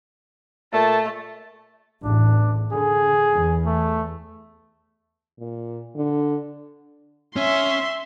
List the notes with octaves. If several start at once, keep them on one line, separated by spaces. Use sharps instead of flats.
A#2 A3 A5
A1 E2 A2 D4
D3 G#4
E2
A3
A#2
D3
C#4 E5 C6